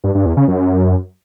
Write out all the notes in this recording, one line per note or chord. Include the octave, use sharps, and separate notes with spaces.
G2
G2
E2
C#3
F#2